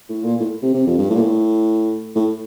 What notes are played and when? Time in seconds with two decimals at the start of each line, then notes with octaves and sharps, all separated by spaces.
0.09 A2
0.24 A#2
0.40 A2
0.62 C3
0.74 C3
0.87 F2
0.98 G2
1.10 A2
1.16 A#2
1.21 A2
2.15 A2